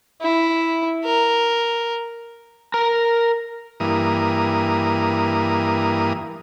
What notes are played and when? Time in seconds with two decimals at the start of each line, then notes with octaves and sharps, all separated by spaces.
0.22 E4
1.04 A#4
2.74 A#4 A#5
3.80 G2 E3 A#3 D#6